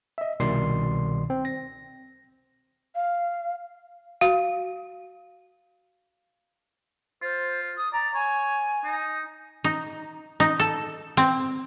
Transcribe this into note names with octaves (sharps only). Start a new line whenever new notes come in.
D#5 E5
C2 B2 D#3 D5 C6 C7
C4
A#6
F5
F#4 F5
F4 C5
D#6
D5 A#5
C#5 G#5
D#4
D#4
D#4
A4
C4